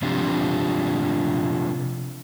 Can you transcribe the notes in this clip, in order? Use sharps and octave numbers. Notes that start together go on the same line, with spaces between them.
C3 F3 C4 D4 G4